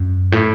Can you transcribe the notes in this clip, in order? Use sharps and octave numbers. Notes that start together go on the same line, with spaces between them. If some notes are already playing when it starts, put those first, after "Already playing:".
Already playing: F#2
A2